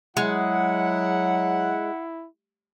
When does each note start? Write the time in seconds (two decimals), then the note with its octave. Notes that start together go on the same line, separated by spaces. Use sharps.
0.17 F#3 G#3 E4 F#5